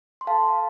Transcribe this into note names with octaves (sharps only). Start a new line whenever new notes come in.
C6
A4 F5 A5